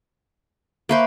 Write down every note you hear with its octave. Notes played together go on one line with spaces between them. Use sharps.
A#3 B4 C5 E5 C#6